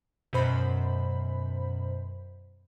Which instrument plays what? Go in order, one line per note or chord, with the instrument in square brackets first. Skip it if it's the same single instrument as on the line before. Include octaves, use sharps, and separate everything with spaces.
[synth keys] F#2 B2 C5 B5